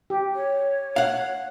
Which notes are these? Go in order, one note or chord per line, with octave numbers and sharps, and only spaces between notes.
G4
C#5
F5 F#5